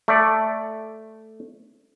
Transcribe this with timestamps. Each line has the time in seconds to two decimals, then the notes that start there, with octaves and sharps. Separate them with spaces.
0.08 A3 D5